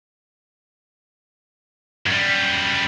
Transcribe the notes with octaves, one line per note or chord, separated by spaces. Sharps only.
F#2 G3